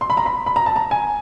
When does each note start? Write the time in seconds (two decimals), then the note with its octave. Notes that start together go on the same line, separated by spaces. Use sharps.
0.01 C6
0.10 B5
0.17 A#5
0.26 B5
0.46 B5
0.56 A#5
0.66 A5
0.76 A#5
0.91 G#5